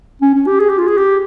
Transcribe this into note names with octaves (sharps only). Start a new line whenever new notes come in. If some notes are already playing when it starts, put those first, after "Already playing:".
C#4
C#4
G4
G#4
G4
F4
G#4
G4